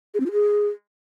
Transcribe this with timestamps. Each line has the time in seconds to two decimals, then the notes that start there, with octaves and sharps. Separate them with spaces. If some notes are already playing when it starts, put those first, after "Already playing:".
0.14 G#4
0.20 C4
0.26 F4
0.32 G#4